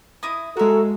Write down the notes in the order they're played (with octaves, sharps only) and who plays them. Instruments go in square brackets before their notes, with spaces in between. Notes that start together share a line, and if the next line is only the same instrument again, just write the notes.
[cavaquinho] E4 D#5 D#6
[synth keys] G#3 F#4 [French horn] A4 [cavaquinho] A#4 E5